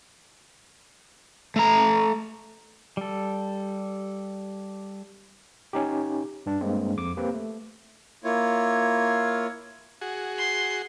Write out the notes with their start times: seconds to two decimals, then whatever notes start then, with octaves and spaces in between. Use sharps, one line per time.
1.56 A3 A#5
2.97 G3 A4
5.73 C#4 D#4 G4
6.46 G2 D4
6.61 G2 G#3 A#3 C4
6.97 F2 D6
7.17 A#3 C4 G4 B4
7.34 A3
8.24 A#3 E4 F4 C#5
10.01 F#4 G#4
10.38 C6